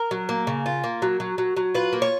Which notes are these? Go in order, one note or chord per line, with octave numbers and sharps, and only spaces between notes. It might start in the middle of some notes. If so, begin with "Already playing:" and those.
Already playing: A#4
F#3
A#3
C#3
F4
A#3
F#3
F#3
F#3
F#3
F4 B4
A#3
C#5